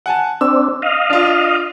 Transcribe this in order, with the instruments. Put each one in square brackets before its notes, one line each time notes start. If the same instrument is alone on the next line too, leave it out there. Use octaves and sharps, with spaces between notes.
[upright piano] F#5 G#5 A5
[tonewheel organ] C4 D4 [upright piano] E6
[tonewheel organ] D#5 F5
[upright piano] D4 F4